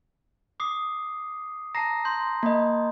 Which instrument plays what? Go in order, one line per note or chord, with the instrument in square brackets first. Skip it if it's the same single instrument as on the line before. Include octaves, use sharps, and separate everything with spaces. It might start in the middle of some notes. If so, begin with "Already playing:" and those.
[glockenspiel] D6 D#6 C7
[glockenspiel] A5 A#5 [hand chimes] A#6 C7
[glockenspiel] C6 G6
[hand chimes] A#3 D#5